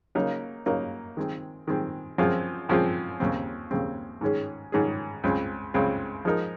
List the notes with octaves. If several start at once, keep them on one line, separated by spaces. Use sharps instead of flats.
C#3 F#3 A#3 D#4 A#4
C#3 F#3 A#3 D#4 A#4
D#3 G#3 C4
D#3 G#3 C4
F#2 F3 G#3 C4 F4
F#2 F3 G#3 C4 F4
D#2 C#3 G#3 C4
D#2 C#3 G#3 C4
G#2 D#3 G#3 C#4 G#4
G#2 D#3 G#3 C#4 G#4
C#2 C#3 G#3 C4
C#2 C#3 G#3 C4
F3 G#3 D#4 A#4